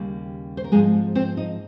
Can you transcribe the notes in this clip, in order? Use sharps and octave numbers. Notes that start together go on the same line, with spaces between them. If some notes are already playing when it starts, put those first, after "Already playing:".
Already playing: D#2 C#3 G3 A#3
C5
A#4
G#2 F3 G#3 C4 G#4
C4 C5
D#4 D#5